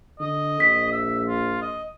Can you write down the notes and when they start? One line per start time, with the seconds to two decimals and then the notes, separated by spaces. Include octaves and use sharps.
0.20 D3 D#5
0.60 A#1 B6
0.92 E5
1.27 F4
1.62 D#5